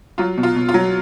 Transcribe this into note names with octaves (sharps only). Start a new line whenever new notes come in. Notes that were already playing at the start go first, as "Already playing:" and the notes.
F#3 F4
B2
F4
B2
F4
F#3